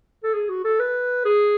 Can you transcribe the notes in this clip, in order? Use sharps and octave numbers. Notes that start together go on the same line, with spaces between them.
A4
G#4
F#4
A4
B4
G#4